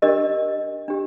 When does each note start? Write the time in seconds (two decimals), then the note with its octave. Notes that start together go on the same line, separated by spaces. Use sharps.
0.02 D4 G4 A#4 D#5
0.88 D4 G4